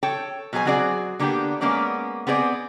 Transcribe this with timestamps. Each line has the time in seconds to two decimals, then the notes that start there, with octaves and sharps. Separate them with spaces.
0.03 A4 C#5 G5
0.53 B2 F#3 G#4 C5 G#5
0.65 F#3 C4 F#4 G#4 C5 D5
1.19 D3 A#3 B3 D4 G4
1.61 G#3 A#3 B3 C#4 D5
2.27 B3 C4 G#4 C#5 D5